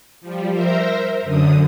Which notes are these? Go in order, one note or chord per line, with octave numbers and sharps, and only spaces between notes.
F3 G3
A#4 C5 E5 A#5
F#2 D3 D#6